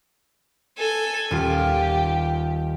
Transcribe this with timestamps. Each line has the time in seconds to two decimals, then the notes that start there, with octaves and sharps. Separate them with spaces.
0.78 A4 G#5
1.31 D#1 F4 G4